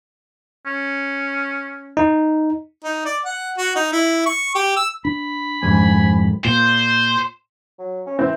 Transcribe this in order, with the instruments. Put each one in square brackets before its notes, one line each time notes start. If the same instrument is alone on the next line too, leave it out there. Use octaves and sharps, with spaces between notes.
[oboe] C#4
[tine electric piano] D#4
[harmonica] D#4
D5
F#5
F#4
D#4
E4
C#6
G4
E6
[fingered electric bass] D4 [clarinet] B5
[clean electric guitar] F2 G#2 [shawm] G#5
[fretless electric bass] A#2 [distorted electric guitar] C5
[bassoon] F#3
C#4
[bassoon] E3 [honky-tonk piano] C4